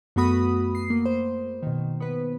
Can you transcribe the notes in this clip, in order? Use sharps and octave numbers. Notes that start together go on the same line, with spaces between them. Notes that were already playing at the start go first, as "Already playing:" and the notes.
F#2 A3 B3 F#4 B5 D#6
C7
A#3
C5
B2 D#3
B3 B4